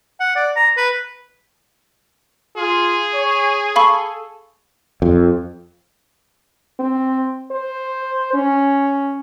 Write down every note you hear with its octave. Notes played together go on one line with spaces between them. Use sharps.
F#5
D5
A#5
B4
F4 G#4
C#5
A4 F5 B5 C#6
F2
C4
C5
C#4